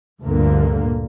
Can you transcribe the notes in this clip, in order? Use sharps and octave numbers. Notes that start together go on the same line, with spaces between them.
D2 G2 A#2 D3 A#3